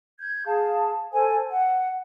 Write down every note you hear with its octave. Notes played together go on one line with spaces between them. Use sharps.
G6 G#6
G#4 F5 A5
A4 C5 G#5
F#5